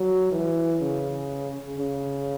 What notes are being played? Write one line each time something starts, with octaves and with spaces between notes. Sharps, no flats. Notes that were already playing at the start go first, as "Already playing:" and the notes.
Already playing: F#3
E3
C#3
C#3